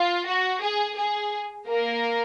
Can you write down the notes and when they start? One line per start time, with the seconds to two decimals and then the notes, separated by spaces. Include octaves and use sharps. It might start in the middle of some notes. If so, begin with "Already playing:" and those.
Already playing: F4
0.28 F#4
0.62 G#4
0.97 G#4
1.68 A#3 A#4